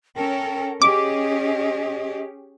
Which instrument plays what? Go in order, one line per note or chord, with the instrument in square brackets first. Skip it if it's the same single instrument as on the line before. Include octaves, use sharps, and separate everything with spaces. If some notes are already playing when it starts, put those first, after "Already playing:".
[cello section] C#4 A4 A#4 [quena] G5
[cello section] C#4 G4 G#4 [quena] D#5 [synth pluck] D6